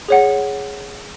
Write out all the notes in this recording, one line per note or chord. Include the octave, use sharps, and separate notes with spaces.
G#4 C#5 F#5